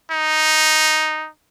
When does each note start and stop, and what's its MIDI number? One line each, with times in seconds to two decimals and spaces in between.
0.11 1.27 63